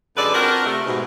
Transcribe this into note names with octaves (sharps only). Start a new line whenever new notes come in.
F#2 D3 G#3 A4 B4 D5
C4 D4 F4 F#4 A#4
C3 A3
G#2 B2